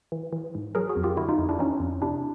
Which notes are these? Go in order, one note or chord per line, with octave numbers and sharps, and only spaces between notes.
E3
E3
G#2
F#3 G#4 A#4
F#4 G#4
F2
F4 G4
D3 E4 F#4
D#4 F4
F2
D4 E4
E3 C#4 D#4
F2
C3 D4 E4